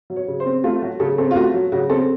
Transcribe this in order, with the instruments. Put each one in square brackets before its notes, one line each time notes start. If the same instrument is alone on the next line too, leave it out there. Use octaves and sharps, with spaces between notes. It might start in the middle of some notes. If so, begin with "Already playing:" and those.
[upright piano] F#3
C#5
C#3
C5
C4
A3 F4
F#3 F#4
C#3 A4
C4 A4
F4
A3 F#4
F#3
C#3 F#4
C4 A4